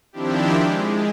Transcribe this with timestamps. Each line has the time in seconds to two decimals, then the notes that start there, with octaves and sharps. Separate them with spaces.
0.13 D#3 F3 C4 D4 E4 G4
0.63 G#3